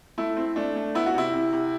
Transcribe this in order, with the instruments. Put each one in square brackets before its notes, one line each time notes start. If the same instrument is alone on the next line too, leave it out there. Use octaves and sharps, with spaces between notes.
[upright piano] A3 E4
C4
A3 D4
A3
B3 E4
F#4
C3 E4
C3
C3